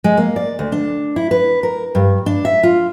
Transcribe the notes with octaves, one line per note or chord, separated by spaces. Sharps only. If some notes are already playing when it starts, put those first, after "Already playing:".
G#3
A#3
D5
D2
D4
E4
B4
A#4
G2
D4
E5
F4